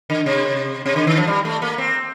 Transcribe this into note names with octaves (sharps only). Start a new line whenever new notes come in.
D3
C3
C3
D3
D#3
F3
G3
A3
A#3
C4